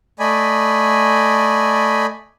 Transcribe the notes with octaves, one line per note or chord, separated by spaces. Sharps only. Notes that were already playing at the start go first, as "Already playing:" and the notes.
A3 D5 D#5 G#5 B5